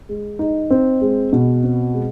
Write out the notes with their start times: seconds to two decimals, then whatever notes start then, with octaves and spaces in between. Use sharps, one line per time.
0.09 G#3
0.39 D#4
0.71 C4
1.01 G#3
1.33 B2
1.63 C4
1.94 G#3